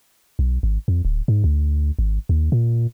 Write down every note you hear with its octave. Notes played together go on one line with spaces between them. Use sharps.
B1
G#1
F2
D1
G#2
D2
G#1
D#2
A#2